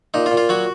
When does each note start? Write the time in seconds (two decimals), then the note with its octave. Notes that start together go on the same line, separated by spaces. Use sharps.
0.14 A#2 D#4
0.26 F4
0.31 A#2
0.37 F4
0.49 F#3 F#4